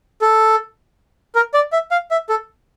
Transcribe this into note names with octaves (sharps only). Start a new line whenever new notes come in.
A4
A#4
D5
E5
F5
E5
A4